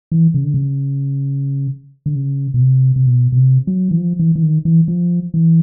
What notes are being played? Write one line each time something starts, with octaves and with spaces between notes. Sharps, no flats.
E3
C#3
D3
C#3
D3
C#3
B2
C3
C3
B2
B2
C3
F#3
E3
F3
E3
E3
D#3
E3
F3
E3